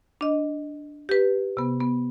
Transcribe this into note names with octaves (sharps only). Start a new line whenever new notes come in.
D4 D#5
G4 B4
C3 B3
B3